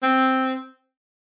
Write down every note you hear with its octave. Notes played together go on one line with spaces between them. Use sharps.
C4